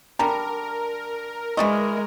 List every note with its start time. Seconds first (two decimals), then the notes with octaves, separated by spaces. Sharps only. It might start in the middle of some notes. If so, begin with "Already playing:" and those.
0.19 D3 G3 A#4 A#5
1.57 E3 G#3 D5 D#5 C#6